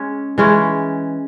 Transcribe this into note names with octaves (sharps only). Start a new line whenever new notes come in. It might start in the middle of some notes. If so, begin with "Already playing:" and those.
Already playing: G#3 C#4
E3 G#3 C#4